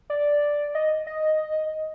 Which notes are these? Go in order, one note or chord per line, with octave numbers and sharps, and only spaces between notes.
D5
D#5
D#5